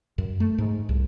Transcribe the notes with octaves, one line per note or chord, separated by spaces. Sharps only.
F#2
A3
G#2
C2